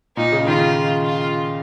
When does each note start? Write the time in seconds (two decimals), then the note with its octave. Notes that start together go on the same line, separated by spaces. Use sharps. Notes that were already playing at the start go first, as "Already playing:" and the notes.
0.17 A#2 D#4
0.32 C#3
0.46 D#3 F4
1.05 F4